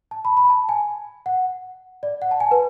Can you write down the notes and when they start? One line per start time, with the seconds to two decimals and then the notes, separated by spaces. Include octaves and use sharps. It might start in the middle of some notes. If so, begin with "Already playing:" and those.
0.11 A5
0.25 B5
0.37 B5
0.50 A5
0.69 G#5
1.26 F#5
2.03 D5
2.22 F#5
2.31 A5
2.40 G#5
2.51 B4